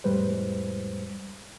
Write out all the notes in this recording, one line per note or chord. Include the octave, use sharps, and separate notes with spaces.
F2 A2 G3 G#3 B4 C5